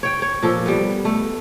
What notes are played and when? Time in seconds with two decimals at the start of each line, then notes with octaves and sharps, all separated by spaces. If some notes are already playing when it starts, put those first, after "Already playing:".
0.03 C#5 G5
0.22 C#5
0.42 A#2 F3 A4
0.66 G3 B3
1.05 A3